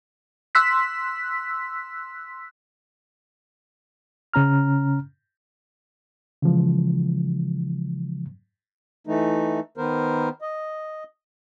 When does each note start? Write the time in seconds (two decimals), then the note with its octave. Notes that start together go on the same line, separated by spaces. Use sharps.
0.55 C6 E6 F#6 B6
4.34 C#3 C#4 A#5 F6
6.42 C#3 E3 F3 G#3
9.07 E3 A3 D#4
9.77 D#3 B3 A#4 C5
10.41 D#5